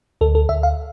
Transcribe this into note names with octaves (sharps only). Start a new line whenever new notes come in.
D2 A4
A4
D2 E5
F5